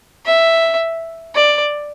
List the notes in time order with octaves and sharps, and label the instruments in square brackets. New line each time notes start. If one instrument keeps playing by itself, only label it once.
[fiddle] E5
D5